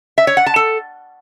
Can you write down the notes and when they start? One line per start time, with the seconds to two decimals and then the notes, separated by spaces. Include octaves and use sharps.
0.18 E5
0.27 C#5
0.37 F#5
0.46 A5
0.56 A4